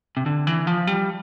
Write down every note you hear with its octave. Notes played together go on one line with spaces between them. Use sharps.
C3
D3
E3
F3
G3